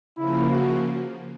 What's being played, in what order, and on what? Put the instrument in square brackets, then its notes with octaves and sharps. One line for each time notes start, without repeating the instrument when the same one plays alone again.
[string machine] C#3 F3 A#3 [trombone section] E4
[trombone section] F#4